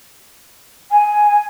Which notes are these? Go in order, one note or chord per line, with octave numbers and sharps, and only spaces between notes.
G#5